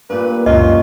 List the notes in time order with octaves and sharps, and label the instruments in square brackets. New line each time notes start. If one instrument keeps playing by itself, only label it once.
[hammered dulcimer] G2 A#2 [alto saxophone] B4
[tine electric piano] C#2 F#2 A#2 [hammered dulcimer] C#4 [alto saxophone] F4 [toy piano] D#5